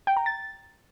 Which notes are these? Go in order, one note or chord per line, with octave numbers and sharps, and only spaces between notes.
G5
A#5
A6